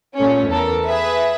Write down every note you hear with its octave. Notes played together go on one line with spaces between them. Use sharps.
A#2 A3 C#4
E2 A4 A#4
G#4 B4 E5